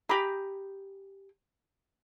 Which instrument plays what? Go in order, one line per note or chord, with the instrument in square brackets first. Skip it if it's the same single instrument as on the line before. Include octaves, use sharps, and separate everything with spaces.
[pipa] G4 G#4 [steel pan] A#5 B5 D6